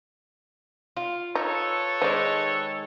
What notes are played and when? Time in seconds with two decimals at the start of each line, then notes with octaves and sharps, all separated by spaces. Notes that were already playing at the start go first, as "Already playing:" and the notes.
0.97 F4
1.35 D#4 A4 B4 C#5
2.02 D#3 G#3 C5 D5